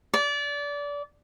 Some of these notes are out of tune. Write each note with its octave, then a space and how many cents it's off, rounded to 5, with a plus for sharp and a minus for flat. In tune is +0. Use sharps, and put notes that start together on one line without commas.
D5 -25